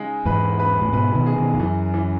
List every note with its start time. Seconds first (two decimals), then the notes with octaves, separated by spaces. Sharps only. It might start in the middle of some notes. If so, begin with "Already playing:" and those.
Already playing: C#3 G#3 D#4
0.25 E2 G#2 B4
0.59 B4
0.81 A2
0.93 G#2 B2 B4
1.15 B2 D#3
1.26 G#4
1.38 B2 D#3
1.54 E2
1.60 F#2 E3
1.94 E3